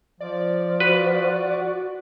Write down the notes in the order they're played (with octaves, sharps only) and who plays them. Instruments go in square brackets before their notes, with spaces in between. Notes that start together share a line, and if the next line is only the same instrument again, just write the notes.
[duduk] F3 [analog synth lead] D5
[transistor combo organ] F#4 [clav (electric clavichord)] B4